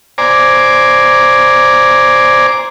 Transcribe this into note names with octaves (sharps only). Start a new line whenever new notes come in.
C5 D5 G#5 A#5 D6